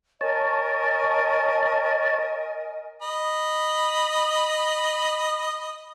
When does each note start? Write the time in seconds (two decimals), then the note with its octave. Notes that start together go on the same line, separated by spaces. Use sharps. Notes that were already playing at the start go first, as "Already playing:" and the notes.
0.21 A#4 C#5 D#5 G#5 A5
3.02 D#5 B5